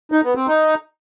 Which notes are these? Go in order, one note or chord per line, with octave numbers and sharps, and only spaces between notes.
D#4
B3
C4
D#4